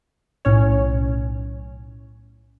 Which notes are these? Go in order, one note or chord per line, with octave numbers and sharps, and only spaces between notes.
B1 A2 C#4 C#5